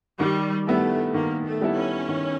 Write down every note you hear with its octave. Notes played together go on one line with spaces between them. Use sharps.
D#3 G3
G3 A3 B3 E4 A4
D#3 A#3
A3
G3 B3 E4 A4
C#4
D#3